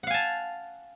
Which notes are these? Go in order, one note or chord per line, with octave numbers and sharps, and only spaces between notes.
F5 F#5 G#5 A5